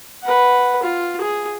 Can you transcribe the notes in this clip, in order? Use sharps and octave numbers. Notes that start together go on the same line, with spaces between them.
B4 F#5
F4
G#4